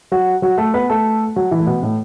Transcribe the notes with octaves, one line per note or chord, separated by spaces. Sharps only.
F#3 F#4
F#3 F#4
A3 A4
B3 B4
A3 A4
F#3 F#4
E3 E4
A3
B2 B3
A2 A3